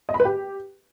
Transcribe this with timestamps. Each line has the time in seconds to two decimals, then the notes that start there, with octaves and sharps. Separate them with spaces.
0.09 D#5
0.14 B5
0.20 B4
0.25 G4